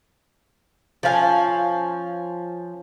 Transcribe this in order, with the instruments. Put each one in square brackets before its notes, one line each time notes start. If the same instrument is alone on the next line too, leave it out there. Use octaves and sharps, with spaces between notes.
[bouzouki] F3 C#4 F5 G#5